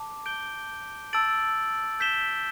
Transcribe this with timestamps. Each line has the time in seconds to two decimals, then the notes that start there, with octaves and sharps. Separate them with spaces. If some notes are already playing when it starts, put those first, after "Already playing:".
Already playing: A5 D6
0.26 G6 D7 G7
1.13 A5 E6 A6 D7 F#7
2.00 G6 B6 E7 G7